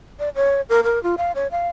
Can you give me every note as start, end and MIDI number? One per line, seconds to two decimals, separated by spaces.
0.19 0.29 74
0.35 0.61 73
0.69 0.81 70
0.84 1.02 70
1.03 1.15 65
1.17 1.32 77
1.35 1.47 73
1.51 1.68 77